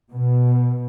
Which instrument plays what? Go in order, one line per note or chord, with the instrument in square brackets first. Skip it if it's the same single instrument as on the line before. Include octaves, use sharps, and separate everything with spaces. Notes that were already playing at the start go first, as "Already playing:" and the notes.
[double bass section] B2